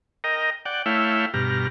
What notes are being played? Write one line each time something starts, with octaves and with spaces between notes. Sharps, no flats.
A#4 D#5 G5 A#5
D5 F#5 G5
A3 E4 C#5 E5 F5 G5
G2 B2 G4 A#5 F6